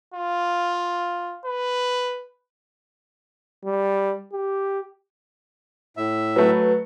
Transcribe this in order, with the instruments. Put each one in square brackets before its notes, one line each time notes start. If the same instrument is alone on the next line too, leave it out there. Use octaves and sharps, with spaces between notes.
[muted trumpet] F4
B4
[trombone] G3
G4
[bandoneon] A2 E5
[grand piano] F#3 A3 [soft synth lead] B4